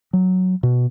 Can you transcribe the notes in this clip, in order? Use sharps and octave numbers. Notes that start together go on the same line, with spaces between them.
F#3
B2